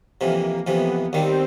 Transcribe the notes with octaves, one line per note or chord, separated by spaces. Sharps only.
F2 C3 E3 A#3
F2 C3 E3 B3
D#2 D#3 G3 C4